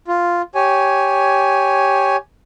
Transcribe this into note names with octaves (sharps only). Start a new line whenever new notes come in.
F4
G4 C#5 G#5